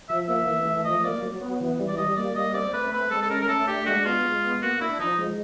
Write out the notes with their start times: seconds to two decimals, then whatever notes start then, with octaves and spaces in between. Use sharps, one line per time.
0.09 F3 E5
0.27 A#3 E5
0.47 E3
0.65 A3
0.84 F3 D#5
1.03 A#3 D5
1.22 F#3
1.41 B3
1.60 E3
1.79 G3
1.88 D5
1.97 G3 D#5
2.16 A#3 D5
2.35 G3 D#5
2.54 C4 D5
2.73 A3 B4
2.92 C4 B4
3.11 G#3 A4
3.22 A4
3.30 C#4 A#4
3.41 A#4
3.48 A3 A4
3.67 D4 G4
3.86 G#3 F#4
4.05 B3 F4
4.24 G#3
4.44 B3
4.62 A#3 F#4
4.81 D4 E4
4.99 F3 D#4
5.18 G#3